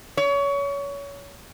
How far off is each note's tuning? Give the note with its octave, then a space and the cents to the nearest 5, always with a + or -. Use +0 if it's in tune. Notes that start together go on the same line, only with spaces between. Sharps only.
C#5 +25